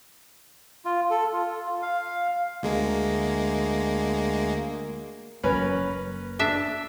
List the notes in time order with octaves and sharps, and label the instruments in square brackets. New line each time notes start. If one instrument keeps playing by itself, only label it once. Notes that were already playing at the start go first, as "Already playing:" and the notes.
[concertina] F4
A4
F4
F5
[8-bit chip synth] D2 G#3 A#3
[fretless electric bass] F#1 F#2 [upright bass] A#3 [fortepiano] C#4 A#4 B4
[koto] D4 E5